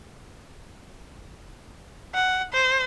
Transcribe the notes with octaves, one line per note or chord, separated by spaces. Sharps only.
F#5
C5